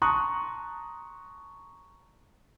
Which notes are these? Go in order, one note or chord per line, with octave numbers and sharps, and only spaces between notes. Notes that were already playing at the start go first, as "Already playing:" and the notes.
A5 A#5 C6 C#6 D#6 F#6